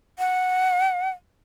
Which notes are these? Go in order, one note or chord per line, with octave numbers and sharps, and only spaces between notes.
F#5